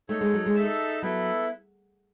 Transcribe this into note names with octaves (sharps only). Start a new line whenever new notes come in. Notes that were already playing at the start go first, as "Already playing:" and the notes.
A3 D#4 A4 C#5
G#3
F#3
G#3
D#4 A4 E5 A5
F#3 B3 E4 A4 E5